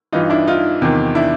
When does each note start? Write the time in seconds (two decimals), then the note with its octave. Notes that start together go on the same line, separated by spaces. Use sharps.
0.12 G2 E3 D#4 F4
0.30 D4 E4
0.47 D#4 F4
0.82 E2 C3 D#3
1.15 D4 E4